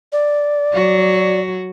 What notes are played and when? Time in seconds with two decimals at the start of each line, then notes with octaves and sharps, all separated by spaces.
0.12 D5
0.73 F#3 F#4